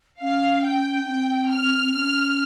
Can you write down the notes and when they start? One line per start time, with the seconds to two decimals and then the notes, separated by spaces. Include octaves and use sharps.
0.21 C#4 F5
0.64 G5
1.03 C#4
1.08 C4 G5
1.51 F6
1.93 C#4 F6